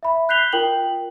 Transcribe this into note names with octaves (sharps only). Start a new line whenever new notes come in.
E5 B5
F#6 G6 B6 C7 F7 G7
F4 A#4 G5 F#7